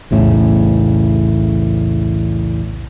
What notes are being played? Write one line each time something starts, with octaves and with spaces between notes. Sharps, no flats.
B1 E2 A2 C#3